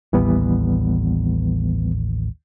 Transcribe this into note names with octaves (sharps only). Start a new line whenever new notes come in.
A1 D#2 E3 G3 B3